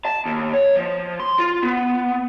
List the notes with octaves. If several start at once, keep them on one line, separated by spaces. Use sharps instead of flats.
A5
D#2
C#5
F3
C6
F4
B3